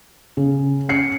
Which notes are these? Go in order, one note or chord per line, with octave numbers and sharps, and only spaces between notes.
C#3
C#4 C7 C#7